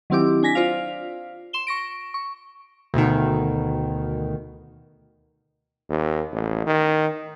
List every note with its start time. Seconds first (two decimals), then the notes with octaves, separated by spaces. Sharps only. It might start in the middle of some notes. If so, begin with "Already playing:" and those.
0.10 D#3 F#3 C4 E4 G4 D6
0.43 D4 G#5 A#6 B6
0.55 F4 C5 D5 F5
1.53 C6 E7 G7
1.67 C#6 A#6 D7
2.14 C#6
2.94 D2 B2 D#3
5.90 D#2
6.32 A1
6.67 D#3